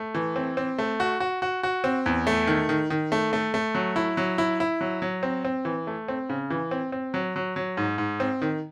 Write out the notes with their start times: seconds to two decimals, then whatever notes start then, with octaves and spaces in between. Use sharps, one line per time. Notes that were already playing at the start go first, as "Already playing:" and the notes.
Already playing: A3
0.15 E3
0.36 C4
0.57 C4
0.79 A3
1.00 F#4
1.20 F#4
1.42 F#4
1.63 F#4
1.84 C4
2.06 E2
2.27 A3
2.47 D#3
2.69 D#3
2.90 D#3
3.12 A3
3.33 A3
3.54 A3
3.75 F#3
3.96 E4
4.17 F#3
4.38 E4
4.60 E4
4.81 F#3
5.02 F#3
5.23 C4
5.45 C4
5.65 E3
5.87 A3
6.08 C4
6.29 C#3
6.50 E3
6.71 C4
6.92 C4
7.14 F#3
7.36 F#3
7.56 F#3
7.77 G#2
7.98 G#2
8.20 C4
8.42 D#3